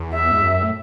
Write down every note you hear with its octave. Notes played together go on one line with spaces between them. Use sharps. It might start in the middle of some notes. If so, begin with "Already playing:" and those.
Already playing: E2
E5
G#2
F#2
A2